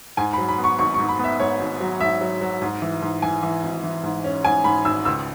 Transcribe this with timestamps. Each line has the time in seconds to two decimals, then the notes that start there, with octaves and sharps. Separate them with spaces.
0.17 G#2 G#5
0.33 B5
0.38 F#3
0.49 B5
0.58 B3
0.64 C#6
0.79 G#1 C#6
0.94 C#6
0.99 G#2
1.09 B5
1.19 B3
1.24 E5
1.40 G#2 C#5
1.60 G#1
1.80 F#3
2.00 G#2 E5
2.21 F#3
2.41 F#3
2.62 G#2
2.82 E3
3.02 G#2
3.22 E3 G#5
3.43 E3
3.63 G#1
3.84 E3
4.03 G#2
4.24 C#4
4.44 G#2 G#5
4.64 G#2 B5
4.85 G#1 E6
5.05 C#2 E6